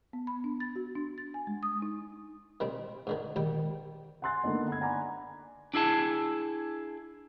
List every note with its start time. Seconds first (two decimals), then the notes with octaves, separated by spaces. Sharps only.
0.13 B3
0.27 B5
0.44 D4
0.60 A6
0.76 F#4
0.95 D4
1.18 A6
1.34 G#5
1.47 G#3
1.63 D#6
1.82 D#4
2.60 D#3 G3 C4
3.07 G#2 D3 D#3
3.36 G#2 D#3 G3 G4
4.22 F#5 G#5 C6 F#6 A6
4.44 D3 A#3 B3 D#4
4.68 F#5 B5 G#6
4.81 D5 F#5 G#5 A#5 B5 D6
5.74 D4 E4 G#4 A5